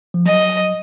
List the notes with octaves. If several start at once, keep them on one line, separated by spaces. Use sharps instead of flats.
F3
F#3 D#5